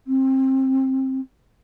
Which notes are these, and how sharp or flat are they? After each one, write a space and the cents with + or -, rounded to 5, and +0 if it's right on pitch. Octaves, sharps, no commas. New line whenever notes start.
C4 +20